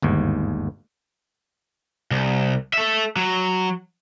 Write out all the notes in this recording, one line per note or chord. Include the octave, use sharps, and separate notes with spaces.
G1 D#2 G#2
C2
A4 E5
F#3